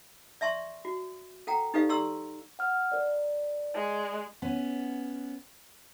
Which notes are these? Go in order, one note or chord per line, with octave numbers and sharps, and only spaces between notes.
D5 E5 A5 C6 C#6
F#4
A4 F#5 G5 A#5
D#4 G4 A4 B4 D5 F5
G4 A4 D5 A#5 C6 E6
F#5 F6
A#4 D5
G#3
B3 C#4